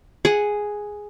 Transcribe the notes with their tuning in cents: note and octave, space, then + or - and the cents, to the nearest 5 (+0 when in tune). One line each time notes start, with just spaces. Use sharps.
G#4 +0 F#5 -5